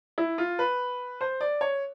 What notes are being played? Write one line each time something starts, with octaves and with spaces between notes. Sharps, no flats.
E4
F4
B4
C5
D5
C#5